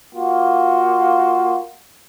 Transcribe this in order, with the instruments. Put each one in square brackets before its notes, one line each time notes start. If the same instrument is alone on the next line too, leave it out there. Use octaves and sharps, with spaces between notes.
[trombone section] A#3 F4 F#4